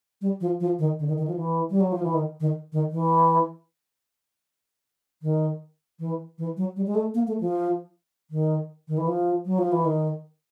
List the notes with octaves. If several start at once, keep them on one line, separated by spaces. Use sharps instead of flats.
G3
F3
F3
D#3
D3
D#3
D#3
F3
E3
G3
F#3
F3
E3
D#3
D#3
D#3
E3
D#3
E3
E3
F#3
G3
G#3
A3
A#3
A3
F3
D#3
D#3
E3
F3
F#3
F3
E3
D#3